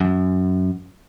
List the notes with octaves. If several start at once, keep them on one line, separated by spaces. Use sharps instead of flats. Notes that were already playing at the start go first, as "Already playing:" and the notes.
F#2